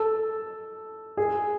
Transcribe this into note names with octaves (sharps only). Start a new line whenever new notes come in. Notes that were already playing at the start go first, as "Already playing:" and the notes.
Already playing: A4
G#4